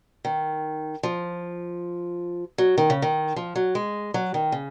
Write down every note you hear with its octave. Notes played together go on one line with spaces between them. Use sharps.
D#3
F3
F#3
D#3
C#3
D#3
F3
F#3
G#3
F#3
D#3
C#3